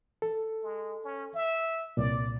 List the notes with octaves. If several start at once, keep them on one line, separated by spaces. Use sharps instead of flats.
A4
G#3
C#4
E5
C2 A#2 D5